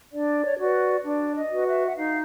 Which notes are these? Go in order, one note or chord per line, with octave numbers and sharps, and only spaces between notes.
D4 D5
C#5
F#4 B4 D5
D4 D5
D#5
F#4 B4
E5
F#5
D#4 F5